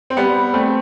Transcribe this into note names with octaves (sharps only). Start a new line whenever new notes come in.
C4
G3 B3
A3 C4